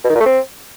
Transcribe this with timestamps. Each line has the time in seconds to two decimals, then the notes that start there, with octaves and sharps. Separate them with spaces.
0.05 B2
0.10 D#3
0.15 A#2
0.21 A3
0.26 C4